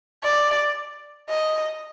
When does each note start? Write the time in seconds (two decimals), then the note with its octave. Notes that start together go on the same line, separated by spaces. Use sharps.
0.24 D5
1.29 D#5